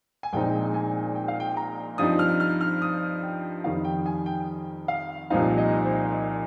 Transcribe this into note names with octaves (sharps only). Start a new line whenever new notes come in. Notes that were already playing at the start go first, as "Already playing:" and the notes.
G#5
A#1 A#2 G#3 C4 D#4 G5
G#5
G5
F5
G5
A#5
G2 F3 C4 D#4 D#6
F6
F6
F6
D#6
G5
F2 D#3 G3 F5
G5
G#5
G5
F5
C2 A#2 F3 C4 D#4 F5
D#5
C5
D#5